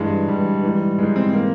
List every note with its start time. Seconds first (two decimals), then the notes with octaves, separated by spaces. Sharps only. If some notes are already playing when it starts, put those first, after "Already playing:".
Already playing: G2 E3 G#3
0.28 G2 E3 G3
0.63 G#2 E3
0.98 G#2 E3 G#3
1.16 C4
1.33 E3 A#3